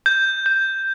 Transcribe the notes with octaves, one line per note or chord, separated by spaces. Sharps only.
G6
G6